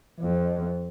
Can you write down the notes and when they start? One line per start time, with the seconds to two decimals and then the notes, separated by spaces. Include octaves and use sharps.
0.20 F2